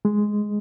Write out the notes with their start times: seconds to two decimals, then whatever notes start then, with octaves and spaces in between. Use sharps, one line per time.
0.05 G#3